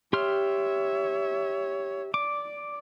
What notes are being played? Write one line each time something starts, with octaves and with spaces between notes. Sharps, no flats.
G4 C#5 E5 C6 F6
D5 D6